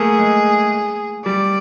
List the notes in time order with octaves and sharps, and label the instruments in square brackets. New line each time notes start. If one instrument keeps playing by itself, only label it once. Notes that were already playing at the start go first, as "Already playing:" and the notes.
Already playing: [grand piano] A3 A#3 [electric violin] G#4
[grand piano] G#3
[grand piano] G3 [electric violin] D5